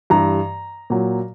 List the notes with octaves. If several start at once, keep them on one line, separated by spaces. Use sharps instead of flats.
G2 E3 G3 A#5
A#2 F#3